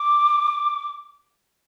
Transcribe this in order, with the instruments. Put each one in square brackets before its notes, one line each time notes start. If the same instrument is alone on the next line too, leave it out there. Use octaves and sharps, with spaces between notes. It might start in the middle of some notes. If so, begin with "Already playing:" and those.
Already playing: [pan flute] D6